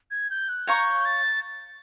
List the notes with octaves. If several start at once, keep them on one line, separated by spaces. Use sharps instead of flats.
G#6
G6
F#6
C#5 F5 A#5 C#6 G6
A6